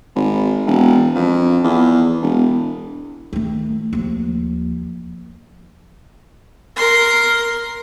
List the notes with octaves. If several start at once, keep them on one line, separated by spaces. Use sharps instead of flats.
G#1
E1
F2
E2
E1
D#3 A3
D#2 F3
A#4 C6